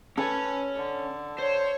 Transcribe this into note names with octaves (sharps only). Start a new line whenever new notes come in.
C#4 A4 B4 G#5
D3
C5 C#5